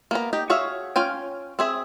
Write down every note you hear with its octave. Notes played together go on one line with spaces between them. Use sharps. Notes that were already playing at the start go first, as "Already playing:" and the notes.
A#3 B3 A#5
D#4 G4
F#4 G#4 C#5 E5 F5
C#4 F4 G5 G#5
C4 G#4 E5